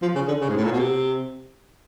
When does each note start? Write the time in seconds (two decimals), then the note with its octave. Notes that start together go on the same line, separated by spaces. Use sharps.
0.02 F3
0.15 C#3
0.28 D3
0.41 C#3
0.49 G#2
0.56 A2
0.64 A#2
0.72 B2
0.79 C3